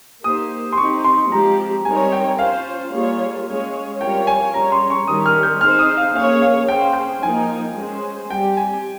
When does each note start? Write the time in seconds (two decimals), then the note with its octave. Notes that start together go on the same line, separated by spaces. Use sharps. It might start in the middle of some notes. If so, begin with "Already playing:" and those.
0.23 A#3 D#4 G4 C5 D#6
0.72 C6
0.77 C4 D#4 G4 C#6
1.04 C6
1.31 F3 G#3 C4 G4 A#5
1.85 G3 C4 D#4 A#4 C#5 G#5
2.12 G5
2.39 C#4 F4 C5 F5
2.92 G3 A#3 F4 G#4 C#5
3.47 G#3 C#4 G#4 C#5
4.01 G3 C4 F4 A#4 C#5 G5
4.27 G#5
4.53 G3 C#4 G#4 C#5 A#5
4.72 C6
4.90 C#6
5.07 D#3 G3 C#4 G4 A#4 D#6
5.26 F6
5.43 G6
5.61 C4 D#4 G#4 C5 F6
5.79 D#6
5.97 F5
6.15 A#3 C#4 G#4 C#5 F5
6.42 F5
6.68 C#4 G#4 C5 G5
6.81 F5
6.93 G5
7.23 F3 A#3 D#4 A#4 G#5
7.77 G#3 C#4 G#4 C5
8.30 G3 C4 G4 G5
8.57 G#5